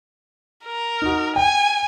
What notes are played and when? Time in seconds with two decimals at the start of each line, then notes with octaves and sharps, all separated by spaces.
0.65 A#4
1.02 D#4 F#4
1.36 G5 G#5